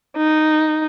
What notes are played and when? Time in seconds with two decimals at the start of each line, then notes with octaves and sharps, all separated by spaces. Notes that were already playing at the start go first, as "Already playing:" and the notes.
0.16 D#4